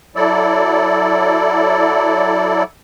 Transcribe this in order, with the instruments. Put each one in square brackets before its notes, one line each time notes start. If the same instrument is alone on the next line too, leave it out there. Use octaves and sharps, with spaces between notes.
[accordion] F#3 E4 A4 D5